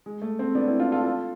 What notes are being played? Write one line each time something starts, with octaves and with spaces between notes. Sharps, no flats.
G#3
A3
A3 C4
B3 D4
C4 E4
D4 F4
F4 A4
F4 A4